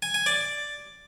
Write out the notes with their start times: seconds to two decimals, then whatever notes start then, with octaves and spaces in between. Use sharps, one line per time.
0.02 G#5
0.14 G#5
0.26 D5